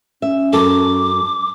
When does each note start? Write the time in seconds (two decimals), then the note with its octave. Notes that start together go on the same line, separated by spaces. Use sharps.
0.22 C#4 E5
0.53 F#2 A4 D6